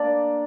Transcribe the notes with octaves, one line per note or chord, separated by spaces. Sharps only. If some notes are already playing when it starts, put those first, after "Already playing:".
Already playing: A#3 D4 D5